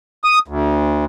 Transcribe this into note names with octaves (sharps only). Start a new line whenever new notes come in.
D#6
D2